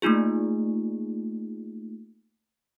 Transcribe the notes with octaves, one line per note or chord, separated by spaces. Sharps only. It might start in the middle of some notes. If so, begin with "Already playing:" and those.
A3 A#3 D#4 F4 G#4